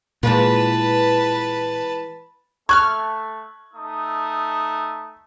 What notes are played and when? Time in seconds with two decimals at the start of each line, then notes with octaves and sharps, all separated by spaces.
0.23 A#2 E3 G#3 F4 B4 A5
2.69 A3 C#6 D6 F6 F#6 G#6
3.74 A3 D#4 D#6